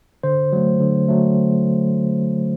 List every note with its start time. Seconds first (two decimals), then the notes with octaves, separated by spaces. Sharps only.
0.23 D3 C5
0.52 F#3 A3
0.80 D3
1.08 F#3 A3